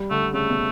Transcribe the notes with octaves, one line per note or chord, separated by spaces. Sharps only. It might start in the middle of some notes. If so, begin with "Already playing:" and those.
Already playing: G3
D3 A3
C#3 A3
B2